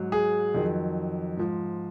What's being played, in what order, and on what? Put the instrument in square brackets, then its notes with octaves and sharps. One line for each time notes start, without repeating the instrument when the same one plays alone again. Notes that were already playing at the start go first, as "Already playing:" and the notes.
Already playing: [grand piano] G#2 F#3
G#4
F2 D#3 F#3
G#2 F3